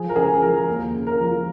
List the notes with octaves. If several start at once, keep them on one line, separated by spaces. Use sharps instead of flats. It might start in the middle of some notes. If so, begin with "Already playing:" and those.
Already playing: F3 G#4
A#4
C#3 G#4
F3 A#4
D#2
C#3
A#4
F3